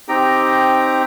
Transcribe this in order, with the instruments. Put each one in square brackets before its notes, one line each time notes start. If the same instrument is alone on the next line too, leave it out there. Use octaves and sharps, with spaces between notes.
[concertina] C4 D#4 G4 G5 A#5